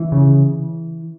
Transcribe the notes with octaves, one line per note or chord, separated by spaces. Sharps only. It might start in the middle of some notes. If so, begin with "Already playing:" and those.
Already playing: E3
C#3